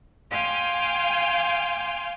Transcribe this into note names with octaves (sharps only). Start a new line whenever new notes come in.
F5 G5 G#5 C6 D6 F6